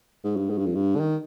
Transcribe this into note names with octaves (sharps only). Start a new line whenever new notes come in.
G#2
G2
G#2
G2
F2
G2
D3
D#3